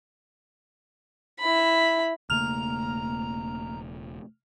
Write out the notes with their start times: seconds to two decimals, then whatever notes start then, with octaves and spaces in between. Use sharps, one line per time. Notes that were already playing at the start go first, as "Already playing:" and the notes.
1.39 E4 B5
2.30 E1 C#3 A3 A#3 A#5 F6 F7